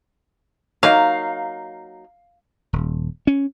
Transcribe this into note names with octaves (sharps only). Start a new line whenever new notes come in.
F#3 A#3 D#4 F5
D#1
C#4